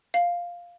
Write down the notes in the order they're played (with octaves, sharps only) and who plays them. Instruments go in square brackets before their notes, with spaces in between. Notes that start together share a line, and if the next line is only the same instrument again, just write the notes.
[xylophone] F5